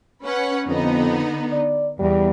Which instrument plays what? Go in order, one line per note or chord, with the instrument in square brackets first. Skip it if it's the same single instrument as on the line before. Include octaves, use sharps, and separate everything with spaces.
[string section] C#4 B4 F#5
[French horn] F2 [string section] D3 B3 D#4
[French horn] D5
[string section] E2 [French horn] G3